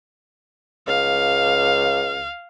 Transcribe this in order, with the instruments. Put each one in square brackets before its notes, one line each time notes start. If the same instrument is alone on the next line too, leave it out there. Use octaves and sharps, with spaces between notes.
[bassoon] C#2 [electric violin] F5